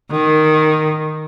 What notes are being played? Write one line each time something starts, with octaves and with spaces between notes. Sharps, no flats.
D#3